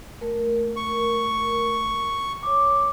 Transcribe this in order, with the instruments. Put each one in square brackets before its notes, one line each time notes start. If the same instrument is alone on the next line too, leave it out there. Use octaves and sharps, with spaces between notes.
[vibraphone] A3 A#4
[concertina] C#6
[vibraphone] C#5 D6